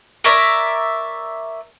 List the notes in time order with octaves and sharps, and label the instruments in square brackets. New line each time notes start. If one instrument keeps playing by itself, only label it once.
[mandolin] A#4 C#5 D5 E5